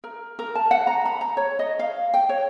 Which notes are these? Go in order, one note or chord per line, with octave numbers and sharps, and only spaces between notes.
A#4
A#4
A5
F#5
A#5
B5
A#5
C#5
D#5
F5
G5
C#5